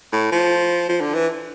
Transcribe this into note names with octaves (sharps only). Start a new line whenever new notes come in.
A2
F3
F3
D3
E3